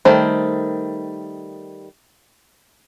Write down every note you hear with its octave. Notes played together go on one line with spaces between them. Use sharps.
D#3 G3 A3 C5